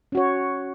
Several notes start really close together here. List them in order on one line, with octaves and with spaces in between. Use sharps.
C#4 F#4 C#5